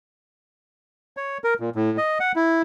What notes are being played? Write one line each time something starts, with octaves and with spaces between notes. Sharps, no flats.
C#5
A#4
A#2
A2
D#5
F#5
E4